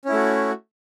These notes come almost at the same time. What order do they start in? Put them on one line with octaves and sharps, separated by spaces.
C#4 E4 A3 F#4